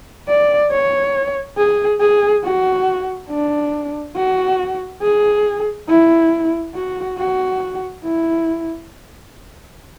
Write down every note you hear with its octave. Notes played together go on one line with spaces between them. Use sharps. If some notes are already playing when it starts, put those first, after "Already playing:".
D5
C#5
G#4
G#4
F#4
D4
F#4
G#4
E4
F#4
F#4
E4